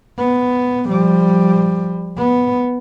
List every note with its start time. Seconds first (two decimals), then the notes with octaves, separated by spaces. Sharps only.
0.18 B3
0.88 F3 G3
2.18 B3